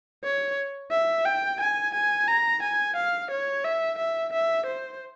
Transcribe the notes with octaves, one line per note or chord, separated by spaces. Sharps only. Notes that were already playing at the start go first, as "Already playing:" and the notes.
C#5
E5
G5
G#5
G#5
A#5
G#5
F5
C#5
E5
E5
E5
C5